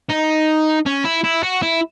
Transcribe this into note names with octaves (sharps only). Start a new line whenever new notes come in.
D#4
C#4
E4
E4
F#4
E4